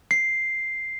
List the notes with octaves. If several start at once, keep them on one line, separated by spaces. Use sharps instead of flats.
C7